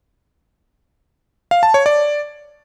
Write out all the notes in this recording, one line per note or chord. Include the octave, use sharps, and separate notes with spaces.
F5
A5
C#5
D5